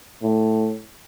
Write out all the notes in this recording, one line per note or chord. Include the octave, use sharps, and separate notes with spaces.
A2